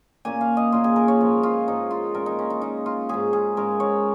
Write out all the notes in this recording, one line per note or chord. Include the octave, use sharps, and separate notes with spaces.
A#2 A#3 C#4 G#5
F5
D#5
A#2 A#3 C#4 F4
G#4
A#4
C#5
G#2 F3 A#3
F4
G#2 F3 A#3 D#4
F4
A#2 G#3 C#4 A#4
D#4
C#4
D#4
A#2 G#3 C#4 D#4
F4
G#2 G#3 C#4 G#4
G#4
G#2 G#3 C#4 A#4
C#5